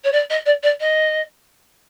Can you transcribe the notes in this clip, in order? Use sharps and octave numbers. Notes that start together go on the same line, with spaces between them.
C#5
D5
D#5
D5
D5
D#5